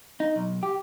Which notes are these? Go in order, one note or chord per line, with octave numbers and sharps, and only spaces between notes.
D#4
B1
G4